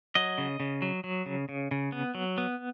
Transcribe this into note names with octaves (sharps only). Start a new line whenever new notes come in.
F#3 D#5
C#3
C#3
F#3
F#3
C#3
C#3
C#3
B3
F#3
B3